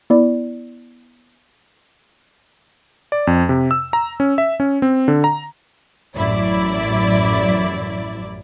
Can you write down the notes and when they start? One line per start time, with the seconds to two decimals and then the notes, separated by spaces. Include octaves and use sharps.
0.10 B3 E4 D5
3.12 D5
3.27 F2
3.49 C3
3.71 E6
3.93 A#5
4.20 C#4
4.38 E5
4.60 C#4
4.82 C4
5.08 D3
5.24 A#5
6.15 A1 F#2 E4 D5